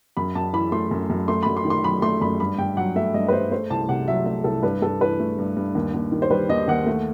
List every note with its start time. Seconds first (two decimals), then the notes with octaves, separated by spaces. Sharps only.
0.17 F#2 B5
0.35 F#2 A5
0.53 E3 B5
0.72 A3 C6
0.91 F#2
1.10 F#2
1.28 A3 C6
1.43 F#2 B5
1.57 C6
1.65 D#3
1.70 C6
1.84 F#3 B5
2.02 A3 C6
2.21 F#2 B5
2.40 G2 B5
2.58 G2 G5
2.77 F#3 F#5
2.96 A3 E5
3.14 G2 D#5
3.28 B4
3.32 G2 C5
3.51 A3 C5
3.70 C2 A5
3.89 C3 F#5
4.08 F#3 E5
4.26 A3 E5
4.44 C2 A4
4.63 G2 B4
4.82 G2 A4
5.01 E3 B4
5.20 A3
5.39 G2
5.57 G2
5.75 D#2
5.94 D#2
6.12 D#3
6.22 C5
6.30 G3 B4
6.49 D#2 D#5
6.68 D#2 F#5
6.87 A3